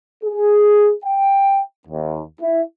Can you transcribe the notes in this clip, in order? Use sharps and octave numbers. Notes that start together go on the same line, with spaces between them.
G#4
G5
D#2
E4